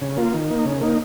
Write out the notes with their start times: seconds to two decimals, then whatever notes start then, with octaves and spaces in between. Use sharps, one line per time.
0.01 C#3
0.17 A#3 F4
0.34 D#3
0.50 A#3 D#4
0.65 C#3
0.81 A#3 D#4